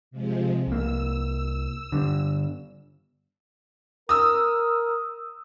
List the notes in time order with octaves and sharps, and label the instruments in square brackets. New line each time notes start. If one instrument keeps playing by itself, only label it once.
[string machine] C3 F3 G#3
[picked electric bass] C2 A#3 [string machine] E6
[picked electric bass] G2 D3
[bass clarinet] A#4 [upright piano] D#6 E6